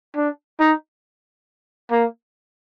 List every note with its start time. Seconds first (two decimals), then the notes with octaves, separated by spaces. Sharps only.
0.16 D4
0.60 D#4
1.91 A#3